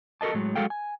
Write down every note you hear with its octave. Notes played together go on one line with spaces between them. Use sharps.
F#4 A4 A#4 D#5 A5
A2 F#3 G#3
F#3 G#3 F#4 A4 F5 G5
G#5